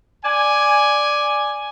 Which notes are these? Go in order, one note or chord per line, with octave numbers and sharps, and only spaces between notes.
D5 G#5